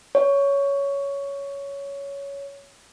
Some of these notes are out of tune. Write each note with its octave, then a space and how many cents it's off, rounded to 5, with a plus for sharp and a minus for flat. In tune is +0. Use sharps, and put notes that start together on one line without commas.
C#5 +10